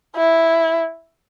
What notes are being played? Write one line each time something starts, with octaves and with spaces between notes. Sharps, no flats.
E4